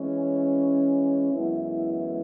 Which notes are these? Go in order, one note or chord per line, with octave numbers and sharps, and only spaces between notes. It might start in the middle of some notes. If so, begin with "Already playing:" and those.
Already playing: E3 G#3 C#4
F#2 E3 G#3 B3 E4